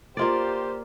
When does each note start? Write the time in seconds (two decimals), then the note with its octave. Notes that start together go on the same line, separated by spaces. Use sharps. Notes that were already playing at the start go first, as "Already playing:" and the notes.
0.17 A#3 F4 G4 C5 D5